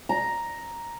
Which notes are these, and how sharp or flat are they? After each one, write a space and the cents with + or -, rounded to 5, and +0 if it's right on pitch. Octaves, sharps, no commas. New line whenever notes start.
A#5 +5